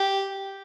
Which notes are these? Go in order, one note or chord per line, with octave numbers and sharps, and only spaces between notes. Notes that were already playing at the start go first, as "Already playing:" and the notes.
Already playing: G4